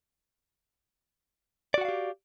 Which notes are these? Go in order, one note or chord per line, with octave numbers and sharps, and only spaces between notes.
F#4 G4 D5 F5 F#5